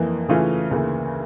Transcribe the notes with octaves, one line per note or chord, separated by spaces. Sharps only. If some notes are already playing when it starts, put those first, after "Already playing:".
Already playing: F2 E3 A#3
C#3 E3 A3 C#4 F4
D2 C#3 E3 A#3